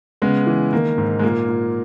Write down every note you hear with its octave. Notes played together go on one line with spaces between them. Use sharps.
C#3 G#3 B3
E3
D#3 A#3
G#2
G#3
A#2 A#3
A#2